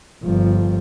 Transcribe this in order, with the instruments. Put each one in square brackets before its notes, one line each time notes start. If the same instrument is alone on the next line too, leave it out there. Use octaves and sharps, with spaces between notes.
[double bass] G1 F3